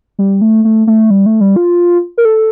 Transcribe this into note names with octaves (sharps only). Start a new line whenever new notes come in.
G3
A3
A3
A3
G3
A3
G3
F4
A#4
A4